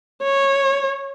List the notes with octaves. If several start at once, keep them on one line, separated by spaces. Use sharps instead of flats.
C#5